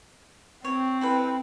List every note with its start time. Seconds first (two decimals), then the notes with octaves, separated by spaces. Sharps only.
0.64 C4 C#5
1.01 E4 A4 B4